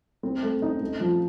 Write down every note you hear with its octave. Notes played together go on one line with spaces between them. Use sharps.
C4
A3
D#4
A3
F3